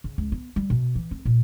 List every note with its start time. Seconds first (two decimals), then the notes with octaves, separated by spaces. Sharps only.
0.04 C#3
0.18 C#2
0.32 B3
0.56 G3
0.70 B2
0.95 E3
1.11 C4
1.25 A#2